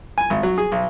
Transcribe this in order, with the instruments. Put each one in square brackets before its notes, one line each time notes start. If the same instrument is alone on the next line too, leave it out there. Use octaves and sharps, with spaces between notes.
[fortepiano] G#5
G#1
F#3
G#4
B1